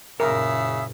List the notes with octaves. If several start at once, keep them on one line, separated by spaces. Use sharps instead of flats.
F#1 A#2 C#3 A#4 E5 D#6